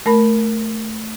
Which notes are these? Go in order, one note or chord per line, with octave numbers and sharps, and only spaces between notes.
A3 A#4 B5